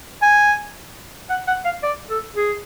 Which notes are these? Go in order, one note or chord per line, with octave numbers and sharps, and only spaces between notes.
G#5
F#5
F#5
F5
D5
A4
G#4